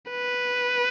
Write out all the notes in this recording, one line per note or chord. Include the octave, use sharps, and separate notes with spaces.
B4